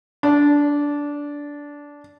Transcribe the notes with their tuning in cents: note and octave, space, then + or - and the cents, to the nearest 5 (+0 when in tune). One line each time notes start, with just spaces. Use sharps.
D4 -15